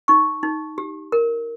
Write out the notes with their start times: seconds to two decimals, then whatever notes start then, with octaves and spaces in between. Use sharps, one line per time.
0.08 D#4 C#6
0.43 D#4
0.78 G4
1.12 A#4